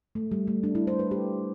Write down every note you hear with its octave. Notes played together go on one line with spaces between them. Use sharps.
A3
G3
A3
D4
E4
C5
B4
G4